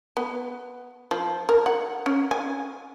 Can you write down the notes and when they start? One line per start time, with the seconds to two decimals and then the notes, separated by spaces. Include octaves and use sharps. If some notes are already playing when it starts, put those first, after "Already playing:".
0.17 B3
1.11 F3
1.49 A#4
1.66 F#5
2.06 C#4
2.31 G#5